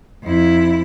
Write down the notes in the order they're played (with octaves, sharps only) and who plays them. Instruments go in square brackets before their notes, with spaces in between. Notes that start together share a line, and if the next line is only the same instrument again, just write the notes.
[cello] F2 E4